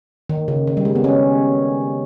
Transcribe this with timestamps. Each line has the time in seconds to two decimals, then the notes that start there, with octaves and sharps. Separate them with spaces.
0.29 D#3
0.48 C#3
0.67 D#3
0.77 G3
0.85 G#3
0.95 B3
1.04 C#4